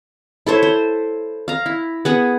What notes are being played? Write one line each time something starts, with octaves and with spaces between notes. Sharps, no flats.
E4 A4 C5 C#5
C5
F5 A#5
E4
B3 G#4 F#5